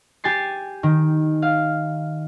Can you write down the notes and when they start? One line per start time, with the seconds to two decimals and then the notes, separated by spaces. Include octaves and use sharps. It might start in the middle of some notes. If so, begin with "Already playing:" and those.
0.24 G4 G#5 A6 C7
0.83 D#3
1.42 F5